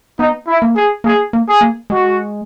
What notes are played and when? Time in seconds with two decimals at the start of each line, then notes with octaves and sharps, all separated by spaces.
0.18 B3 D#4
0.47 E4
0.62 A#3
0.76 G#4
1.04 A#3 G#4
1.33 A#3
1.47 G#4
1.61 A#3
1.90 G#3 F#4